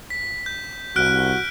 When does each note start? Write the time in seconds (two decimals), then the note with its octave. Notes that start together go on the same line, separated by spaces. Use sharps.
0.10 B6
0.46 G6
0.96 C2 F#4 F6 F#6 D7